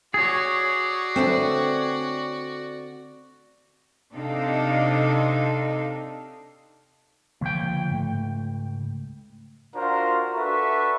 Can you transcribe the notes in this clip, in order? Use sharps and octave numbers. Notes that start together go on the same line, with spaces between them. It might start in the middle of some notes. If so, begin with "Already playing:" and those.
F#4 G#4 C#5 D5
D3 A3 C4 B4
C3 D4 D#4 A4 D#5 F5
C#2 D3 F3 A#3 G5
G#2 A3
D4 F4 F#4 A#4 C5 A#5
D4 F#4 A4 B4 E5 C#6